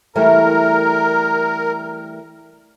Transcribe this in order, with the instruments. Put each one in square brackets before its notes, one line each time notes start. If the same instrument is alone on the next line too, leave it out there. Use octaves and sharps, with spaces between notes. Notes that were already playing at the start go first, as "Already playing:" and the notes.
[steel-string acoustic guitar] E3 G3 A3 [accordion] A#4